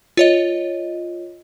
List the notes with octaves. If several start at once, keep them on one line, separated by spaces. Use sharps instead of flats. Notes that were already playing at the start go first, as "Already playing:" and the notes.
F4 C#5 D#5